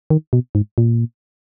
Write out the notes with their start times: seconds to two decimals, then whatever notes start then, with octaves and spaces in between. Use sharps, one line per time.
0.10 D#3
0.33 B2
0.55 G#2
0.78 A#2